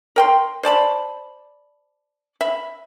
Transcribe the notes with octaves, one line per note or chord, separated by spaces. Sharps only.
A#4 G5 C6
C5 D5 A5 B5
E5 B5